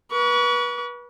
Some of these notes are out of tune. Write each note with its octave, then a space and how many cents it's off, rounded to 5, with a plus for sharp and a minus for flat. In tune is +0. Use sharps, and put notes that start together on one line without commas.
B4 -30 C#6 +35